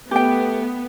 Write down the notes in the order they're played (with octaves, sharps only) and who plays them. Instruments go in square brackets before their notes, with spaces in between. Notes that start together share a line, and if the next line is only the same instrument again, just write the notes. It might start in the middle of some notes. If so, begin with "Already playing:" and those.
[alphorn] A3 [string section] B3 [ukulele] G4 G5